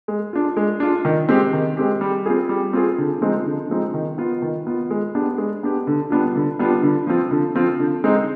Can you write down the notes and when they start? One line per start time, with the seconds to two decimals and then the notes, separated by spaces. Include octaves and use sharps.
0.08 G#3
0.33 D4 F4
0.57 G#3
0.80 D4 F4
1.05 D#3
1.29 G#3 C4 G4
1.53 D#3
1.77 G#3 C4 G4
2.01 G3
2.26 C4 F4 G#4
2.49 G3
2.73 C4 F4 G#4
2.98 D3
3.21 F3 G#3 C4 D#4
3.45 D3
3.70 F3 G#3 C4 D#4
3.94 D#3
4.18 B3 F4
4.42 D#3
4.67 B3 F4
4.90 G#3
5.15 B3 D4 G4
5.38 G#3
5.63 B3 D4 G4
5.87 D3
6.10 G3 B3 D4 F4
6.36 D3
6.59 G3 B3 D4 F4
6.83 D3
7.07 F3 C4 F4
7.31 D3
7.55 F3 C4 F4
7.80 D3
8.04 G#3 C4 D#4